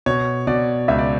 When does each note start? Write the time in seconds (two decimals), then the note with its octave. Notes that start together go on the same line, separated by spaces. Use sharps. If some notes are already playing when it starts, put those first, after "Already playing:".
0.06 B2 C#5
0.47 B2 D5
0.88 C#2 E5
0.98 D5